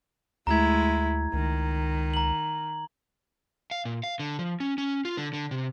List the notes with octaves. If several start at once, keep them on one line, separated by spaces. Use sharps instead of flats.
D2 G#3 A3 E4 A#5 G#6
C#2 D#3
A#5 F#7
F5
A#2
F5
D3
F3
C#4
C#4
F4
D3
D3
C3